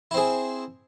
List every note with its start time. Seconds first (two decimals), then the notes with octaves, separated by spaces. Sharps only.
0.11 E4
0.14 C4
0.17 G#4